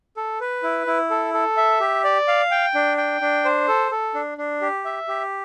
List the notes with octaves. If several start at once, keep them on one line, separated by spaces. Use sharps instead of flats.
A4
B4
E4
E4
A4
A4
E5
G4
D5
F5
G5
D4
G5
D4
C5
A4
A4
D4
D4
G4
E5
G4